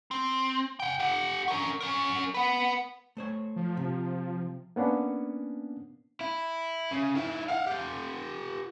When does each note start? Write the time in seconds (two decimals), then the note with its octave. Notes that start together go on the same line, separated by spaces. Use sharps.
0.11 C4
0.80 F#5 G5
1.00 G4 F#5
1.48 C#4 A#4
1.81 C#4 A#4
2.34 B4 F#5
3.17 A3 C5 C#5
3.56 F3
3.77 C3
4.76 A#3 B3 C#4 D4
6.21 E4
6.91 C#3
7.15 D#3 E4
7.48 F5 F#5
7.66 F4 G4